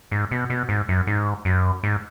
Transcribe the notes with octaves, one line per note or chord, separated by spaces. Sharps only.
G#2
B2
B2
G#2
F#2
G#2
F#2
G#2